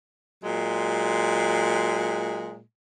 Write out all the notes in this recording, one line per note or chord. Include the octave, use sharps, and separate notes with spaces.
A#2 F#3 G#3